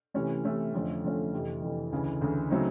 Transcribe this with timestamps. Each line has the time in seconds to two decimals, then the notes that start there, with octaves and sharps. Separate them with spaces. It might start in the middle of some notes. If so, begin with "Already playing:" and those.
0.14 C3 E3 A3 C#4
0.45 C3 E3 A3 C#4
0.73 F2 D3 F3 A3 C#4
1.03 F2 D3 F3 A3 C#4
1.33 F2 C3 E3
1.62 F2 C3 E3
1.92 D2 C#3 E3
2.21 D2 C#3 E3
2.50 C#3 F#3 A3 C4 D#4